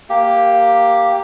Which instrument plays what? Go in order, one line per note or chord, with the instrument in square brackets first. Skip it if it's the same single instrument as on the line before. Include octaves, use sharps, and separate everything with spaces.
[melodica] A#3 G4